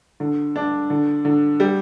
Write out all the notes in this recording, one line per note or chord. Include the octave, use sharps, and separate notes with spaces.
D3
D4
D3
D3
G3